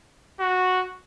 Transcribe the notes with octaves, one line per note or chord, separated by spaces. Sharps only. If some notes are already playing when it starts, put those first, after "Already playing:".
F#4